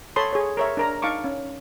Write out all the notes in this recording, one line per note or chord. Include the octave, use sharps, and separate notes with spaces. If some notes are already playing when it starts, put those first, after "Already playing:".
A4 C#5 A5 B5 C6 D#6
G#4 C#5
A#4 C#5 E5
D4 A#4 A#5
D#4 F5 A5 C#6 D6
C#4